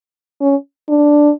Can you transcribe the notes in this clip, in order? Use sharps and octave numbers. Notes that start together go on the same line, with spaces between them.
C#4
D4